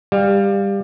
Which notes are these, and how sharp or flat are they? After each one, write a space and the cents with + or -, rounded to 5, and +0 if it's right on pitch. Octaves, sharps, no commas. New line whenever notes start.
G3 +20 F5 +0